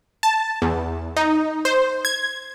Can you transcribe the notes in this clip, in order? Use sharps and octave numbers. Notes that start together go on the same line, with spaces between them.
A5
E2
D#4
C5
G#6